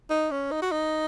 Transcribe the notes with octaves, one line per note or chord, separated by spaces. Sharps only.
D#4
C#4
D#4
F#4
D#4